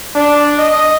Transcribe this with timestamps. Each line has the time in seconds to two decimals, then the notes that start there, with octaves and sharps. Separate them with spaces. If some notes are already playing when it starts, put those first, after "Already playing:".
0.15 D4
0.59 D#5